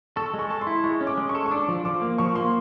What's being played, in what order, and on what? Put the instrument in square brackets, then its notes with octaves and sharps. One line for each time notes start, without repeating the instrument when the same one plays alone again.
[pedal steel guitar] A4 [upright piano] C#6
[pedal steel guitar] G#3
[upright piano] C#6
[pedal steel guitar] A4
[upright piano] C6
[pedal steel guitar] E4
[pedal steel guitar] G#3 [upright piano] C#6
[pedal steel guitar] C#4
[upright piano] D6
[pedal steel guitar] G#3
[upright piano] C#6
[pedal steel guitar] A4
[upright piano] C#6
[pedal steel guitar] D4 [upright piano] D6
[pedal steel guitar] F3
[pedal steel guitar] F3 [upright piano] D6
[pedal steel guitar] A#3
[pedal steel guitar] F3 [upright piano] C#6
[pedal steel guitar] A#3 [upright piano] C6